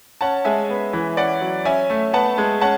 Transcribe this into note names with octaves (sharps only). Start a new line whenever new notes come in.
C#4 F#5 A5
G#3 E5 G#5
B3
E3
C#4 D5 F#5
F#3
C#4 E5 G#5
A3
B3 F#5 A5
G#3
C#4 F#5 A5